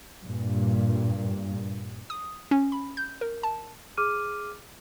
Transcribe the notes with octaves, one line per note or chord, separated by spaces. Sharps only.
G2 A#2
D#6
C#4
B5
G6
A#4
A5
G#4 D6 F6 D#7